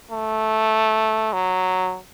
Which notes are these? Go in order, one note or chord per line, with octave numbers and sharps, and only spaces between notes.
A3
F#3